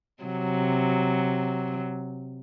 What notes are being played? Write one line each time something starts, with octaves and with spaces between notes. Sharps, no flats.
C3 F#3